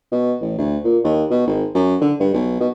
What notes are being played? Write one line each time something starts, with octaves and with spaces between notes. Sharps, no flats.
B2
A1
D2
A#2
D#2
B2
G#1
F#2
D3
G2
B1
B2